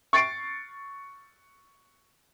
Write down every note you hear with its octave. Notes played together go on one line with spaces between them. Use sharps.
C#6 A6 C7 D7